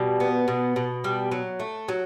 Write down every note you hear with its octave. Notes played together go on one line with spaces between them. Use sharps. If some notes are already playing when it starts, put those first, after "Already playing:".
Already playing: B2 G3
B3
B2
B2
G3
F#3
A3
F#3